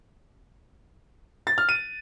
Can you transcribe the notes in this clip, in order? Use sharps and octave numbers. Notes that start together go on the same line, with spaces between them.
A6
F6
D#7